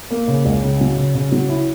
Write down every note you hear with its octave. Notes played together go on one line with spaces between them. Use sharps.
A#3
C#3
C#2
C#3
F#3
C#3
C#3
F#3
E4